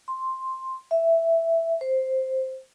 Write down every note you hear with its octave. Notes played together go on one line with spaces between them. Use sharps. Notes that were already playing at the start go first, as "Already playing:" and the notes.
C6
E5
C5